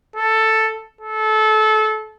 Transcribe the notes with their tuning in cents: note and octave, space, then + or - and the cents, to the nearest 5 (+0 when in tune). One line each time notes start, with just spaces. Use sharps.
A4 +5
A4 -25